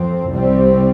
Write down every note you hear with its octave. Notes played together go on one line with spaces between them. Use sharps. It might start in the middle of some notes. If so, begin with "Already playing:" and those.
Already playing: F2 F3 C4
C2 C3 G3 C4